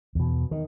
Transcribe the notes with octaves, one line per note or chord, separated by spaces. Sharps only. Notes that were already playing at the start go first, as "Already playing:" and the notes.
E2 B2
D#3